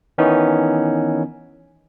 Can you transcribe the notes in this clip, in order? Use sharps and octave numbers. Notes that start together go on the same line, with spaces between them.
D#3 E3 B3 C#4 D#4